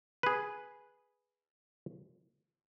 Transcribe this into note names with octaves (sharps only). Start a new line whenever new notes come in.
G#4 B4